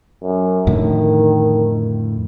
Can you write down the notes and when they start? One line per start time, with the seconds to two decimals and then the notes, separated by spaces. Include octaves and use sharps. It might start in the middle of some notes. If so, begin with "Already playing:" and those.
0.23 F#2
0.67 F2 A2 D3 D#3